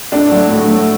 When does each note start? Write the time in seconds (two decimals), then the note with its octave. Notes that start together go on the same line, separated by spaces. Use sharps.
0.12 A2 D4
0.31 F#3 A3
0.50 A2
0.69 F#3 A3